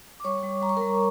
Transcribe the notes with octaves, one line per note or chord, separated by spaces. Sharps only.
D6
G3 C#5 C#6
G3
G3 A#5
C#6
G3 A#4 A#5